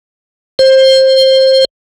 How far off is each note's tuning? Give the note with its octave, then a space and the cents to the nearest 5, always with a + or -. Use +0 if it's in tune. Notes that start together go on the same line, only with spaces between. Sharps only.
C5 +20